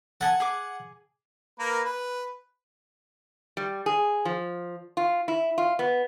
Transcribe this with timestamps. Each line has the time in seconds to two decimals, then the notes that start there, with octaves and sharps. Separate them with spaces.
0.21 A4 F#5 G#5 A5
0.40 G#4 G#5 D6
1.59 A#3 A#4 B4
1.84 B4
3.57 G3
3.86 G#4
4.25 F3
4.97 F4
5.28 E4
5.58 F4
5.79 B3